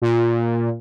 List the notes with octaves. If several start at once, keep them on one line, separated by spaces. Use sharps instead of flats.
A#2